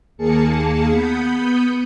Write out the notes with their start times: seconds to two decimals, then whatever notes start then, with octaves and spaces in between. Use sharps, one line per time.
0.17 D#2 A#3 G#4 A5 C#7
0.90 B3 B5 D#6 G6 C#7